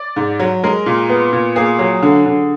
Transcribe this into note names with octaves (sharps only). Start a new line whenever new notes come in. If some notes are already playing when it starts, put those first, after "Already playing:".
Already playing: D5
G#2
F#3
G#3 A#4
A#2
B3
A#2
A#3 G#4
F#3
D3
D3